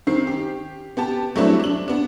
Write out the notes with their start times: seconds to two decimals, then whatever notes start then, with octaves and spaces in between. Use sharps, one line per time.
0.07 D#3 C4 C7
0.27 G4
0.97 B3 G4 A5
1.36 F#3 G3 A3 C4 D4 E4
1.60 D4 F#7
1.88 B3 D4